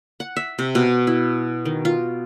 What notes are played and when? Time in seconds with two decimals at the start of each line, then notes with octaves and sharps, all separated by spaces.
0.20 F#5
0.37 E5
0.59 C3
0.75 B2
1.07 E4
1.65 D#3
1.85 F4